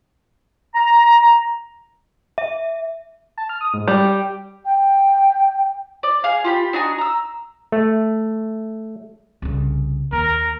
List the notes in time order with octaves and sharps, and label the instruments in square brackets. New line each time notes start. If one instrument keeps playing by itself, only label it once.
[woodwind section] A#5
[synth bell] E5
[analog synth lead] A5
F6
D#6
G#2
[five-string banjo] G3 [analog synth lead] G5
[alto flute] G5
[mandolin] D5
G#4 F5
F4 G4 B5
D4 D#4 F#4 G#5
A#5 E6
[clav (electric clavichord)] A3
[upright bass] C2 C#3
[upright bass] D#2 [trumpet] A#4